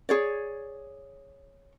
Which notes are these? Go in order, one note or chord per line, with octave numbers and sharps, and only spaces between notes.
G#4 C#5 D5